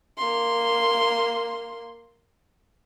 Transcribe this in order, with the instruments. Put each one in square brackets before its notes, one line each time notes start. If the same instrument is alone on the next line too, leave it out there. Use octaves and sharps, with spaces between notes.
[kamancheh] A#3 C6